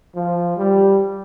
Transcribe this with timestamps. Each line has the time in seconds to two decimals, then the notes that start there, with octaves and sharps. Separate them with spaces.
0.16 F3
0.57 G3